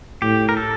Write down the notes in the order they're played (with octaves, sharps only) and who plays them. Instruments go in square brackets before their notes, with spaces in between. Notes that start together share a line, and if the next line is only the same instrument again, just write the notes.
[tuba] A2 [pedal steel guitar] G4
[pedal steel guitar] A#4
A4